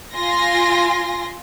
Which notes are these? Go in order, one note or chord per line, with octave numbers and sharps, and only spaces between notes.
F4 G#5 C6 A#6